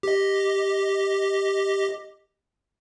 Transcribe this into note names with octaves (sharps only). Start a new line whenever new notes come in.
G4 D#5